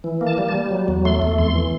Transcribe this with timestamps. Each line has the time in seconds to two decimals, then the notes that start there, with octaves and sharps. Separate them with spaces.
0.04 E3
0.21 A#3
0.27 A5
0.38 G3
0.48 A5
0.54 G3
0.71 F#3
0.88 E2
1.05 A3 C6
1.22 E2
1.38 F2 C6
1.55 E3